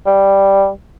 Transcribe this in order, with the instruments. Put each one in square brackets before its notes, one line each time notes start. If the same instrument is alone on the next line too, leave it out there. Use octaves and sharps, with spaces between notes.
[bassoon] G3